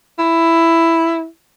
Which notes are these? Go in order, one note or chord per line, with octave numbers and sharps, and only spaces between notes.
E4